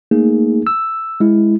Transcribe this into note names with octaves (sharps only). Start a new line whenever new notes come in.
A3 A#3 D#4 G#4
E6
G#3 E4